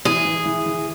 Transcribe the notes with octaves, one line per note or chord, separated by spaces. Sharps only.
E3 G#4
E3
E3
E3